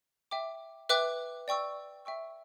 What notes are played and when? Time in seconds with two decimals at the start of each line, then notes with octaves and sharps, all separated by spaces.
0.31 E5 G5 D6
0.89 B4 E5 G5 D6 F#6
1.48 D5 G5 C#6 E6
2.05 E5 G5 C#6 E6